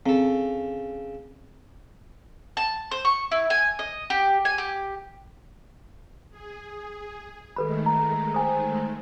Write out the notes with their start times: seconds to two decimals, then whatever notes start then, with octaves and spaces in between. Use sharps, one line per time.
0.06 C#3 C4 A4
2.57 A5
2.91 C5
3.05 C#6
3.31 E4
3.50 G#5
3.79 D#5
4.10 G4
4.45 G#5
4.58 G4
6.30 G#4
7.56 D#3 G#3 A3 A4 B4 B5
7.86 A#5
8.34 C5 G5 G#5 D#6